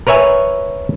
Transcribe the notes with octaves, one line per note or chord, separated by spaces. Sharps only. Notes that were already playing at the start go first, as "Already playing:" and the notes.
A#4 B4 C#5 E5 G#5